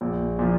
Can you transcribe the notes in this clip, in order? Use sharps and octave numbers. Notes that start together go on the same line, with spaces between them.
A#1
A#2 F3